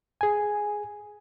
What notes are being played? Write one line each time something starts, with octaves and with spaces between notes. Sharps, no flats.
G#4 G#5